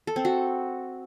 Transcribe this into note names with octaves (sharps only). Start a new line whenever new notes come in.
A4
C4
F#4